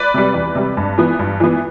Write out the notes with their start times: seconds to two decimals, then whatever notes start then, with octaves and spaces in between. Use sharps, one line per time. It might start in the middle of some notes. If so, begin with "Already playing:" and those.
Already playing: B4 D5
0.14 C3 G3
0.34 E2
0.55 C3 G3
0.77 G2
0.98 E3 B3
1.19 G2
1.40 E3 B3